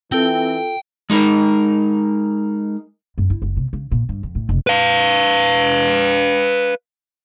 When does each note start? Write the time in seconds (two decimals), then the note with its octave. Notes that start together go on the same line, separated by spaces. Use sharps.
0.12 E3 C4 F4 A4 G5
1.10 G#3 D#4 A#4
3.18 F#2
3.30 E4
3.42 F#1
3.57 C3
3.73 C#3
3.91 A#2
4.09 G2
4.23 F2
4.35 A2
4.49 F1
4.67 B4 F5